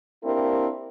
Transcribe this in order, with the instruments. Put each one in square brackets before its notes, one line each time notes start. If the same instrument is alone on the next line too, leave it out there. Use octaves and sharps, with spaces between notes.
[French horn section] A#3 C4 D4 E4 G4 A#4